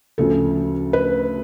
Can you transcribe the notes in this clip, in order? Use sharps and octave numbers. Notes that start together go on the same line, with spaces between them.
D2 C#3 F3 A4
B4